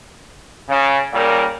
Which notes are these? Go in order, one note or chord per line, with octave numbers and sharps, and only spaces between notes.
C#3
A#2 C#3 G3 A#4